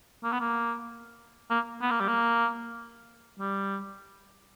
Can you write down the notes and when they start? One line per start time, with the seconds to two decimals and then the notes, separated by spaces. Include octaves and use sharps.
0.24 A#3
0.32 B3
0.40 A#3
1.50 A#3
1.81 B3
1.91 A#3
2.00 G3
2.08 A#3
3.39 G3